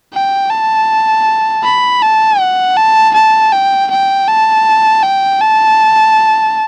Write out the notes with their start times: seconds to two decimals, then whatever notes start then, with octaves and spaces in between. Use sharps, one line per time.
0.14 G5
0.50 A5
1.64 B5
2.02 A5
2.40 F#5
2.77 A5
3.14 A5
3.52 G5
3.90 G5
4.28 A5
5.03 G5
5.41 A5